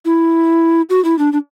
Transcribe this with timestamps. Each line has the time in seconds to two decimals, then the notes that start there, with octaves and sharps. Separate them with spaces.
0.05 E4
0.90 F#4
1.04 E4
1.19 D4
1.33 D4